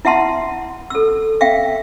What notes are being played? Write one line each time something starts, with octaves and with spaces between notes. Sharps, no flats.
E4 E5 F#5 A5 C6
A4 E6
E5 F5 G5